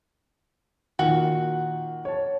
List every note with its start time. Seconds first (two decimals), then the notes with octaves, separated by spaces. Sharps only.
0.99 A#2 D#3 F#4
2.05 C#5 A5